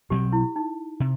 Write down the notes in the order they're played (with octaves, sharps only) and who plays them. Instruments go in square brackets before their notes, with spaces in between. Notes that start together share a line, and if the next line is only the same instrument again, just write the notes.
[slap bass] B2 F#3 C4 [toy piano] G4
[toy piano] E4
D#4
[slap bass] C3